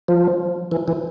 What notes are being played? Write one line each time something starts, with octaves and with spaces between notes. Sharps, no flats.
F3
E3
E3